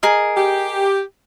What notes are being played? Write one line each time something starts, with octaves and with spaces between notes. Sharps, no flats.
G#4 A#4 D#5
G4